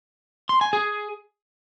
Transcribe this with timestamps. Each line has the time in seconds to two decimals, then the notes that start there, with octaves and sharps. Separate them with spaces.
0.49 C6
0.61 G#5
0.73 G#4